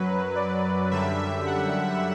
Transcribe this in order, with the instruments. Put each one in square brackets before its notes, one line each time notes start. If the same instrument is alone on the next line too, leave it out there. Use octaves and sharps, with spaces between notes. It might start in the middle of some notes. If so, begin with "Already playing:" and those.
Already playing: [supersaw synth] F#2 F#3 B4
D5
F#2 D3 G3 E5
F#5